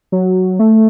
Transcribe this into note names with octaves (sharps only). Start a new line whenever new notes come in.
F#3
A3